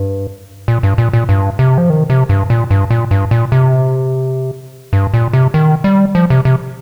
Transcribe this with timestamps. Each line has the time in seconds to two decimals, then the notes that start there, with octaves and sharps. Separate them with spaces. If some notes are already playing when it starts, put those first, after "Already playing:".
Already playing: G2
0.68 A#2
0.83 G2
0.98 A#2
1.13 A#2
1.29 G2
1.59 C3
1.78 F3
1.90 D#3
2.10 C3
2.29 G2
2.50 A#2
2.71 G2
2.90 A#2
3.11 G2
3.31 A#2
3.52 C3
4.93 G2
5.14 A#2
5.33 C3
5.54 D#3
5.84 G3
6.15 F3
6.30 C3
6.45 C3